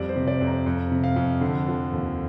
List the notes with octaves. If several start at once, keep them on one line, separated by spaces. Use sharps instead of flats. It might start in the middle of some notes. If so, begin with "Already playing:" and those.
Already playing: F2 G3 D5
C5
C3
D5
F2
A#5
F2
C3
F5
F2
D3
F3
D#2